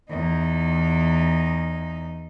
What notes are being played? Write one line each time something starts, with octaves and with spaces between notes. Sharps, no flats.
E2 D#4